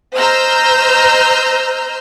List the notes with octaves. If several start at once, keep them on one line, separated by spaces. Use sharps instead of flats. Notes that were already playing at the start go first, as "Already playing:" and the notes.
C5 D#5 A#5 E6 F6 G6